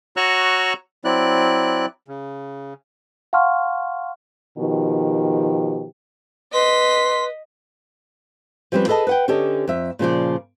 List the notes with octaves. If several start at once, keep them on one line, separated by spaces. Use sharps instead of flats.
F#4 C#5 A#5 C#6 E6 F#6
F#3 C4 E4 D5 F#6
C#3
F5 F#5 A5 C6 C#6 F6
B2 D#3 F3 G4
B4 D#5 C6 B6
F3 G3 C4 C#4 B4
G#4 A4 B4 C5 D#5 A5
B4 F#5 G5
D3 C#4 G4 A4 C#5 D#5
F2 E5
A#2 C#3 F3 D5